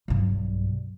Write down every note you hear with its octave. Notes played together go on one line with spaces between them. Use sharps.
B1 G2